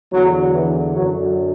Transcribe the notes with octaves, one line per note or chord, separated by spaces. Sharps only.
E2 D3 F#3
E3
F#2 D3 F#3